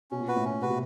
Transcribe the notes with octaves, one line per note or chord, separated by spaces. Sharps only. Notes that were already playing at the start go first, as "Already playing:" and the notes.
B2 C#4
A#2
F#4 B4
A2
A#2 C#4
C3 F#4 B4
B2